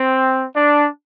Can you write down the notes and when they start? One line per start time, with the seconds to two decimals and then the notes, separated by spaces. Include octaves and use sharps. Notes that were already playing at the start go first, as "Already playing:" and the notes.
Already playing: C4
0.55 D4